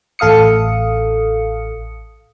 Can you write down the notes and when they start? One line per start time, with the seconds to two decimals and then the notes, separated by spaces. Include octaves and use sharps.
0.19 A1 A4 F5 D#6 C#7